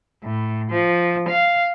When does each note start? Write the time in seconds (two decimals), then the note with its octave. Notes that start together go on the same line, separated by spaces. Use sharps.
0.23 A2
0.71 F3
1.28 F5